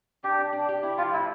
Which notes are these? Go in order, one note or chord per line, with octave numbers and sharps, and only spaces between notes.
D4 G4
D4
D4
G4
E4
F3 F4
A2 E4